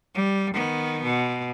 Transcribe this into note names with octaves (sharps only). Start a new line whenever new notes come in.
G3
D#3 B3
B2